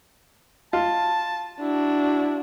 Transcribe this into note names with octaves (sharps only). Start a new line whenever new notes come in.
F4 A5
D4 E4 F#4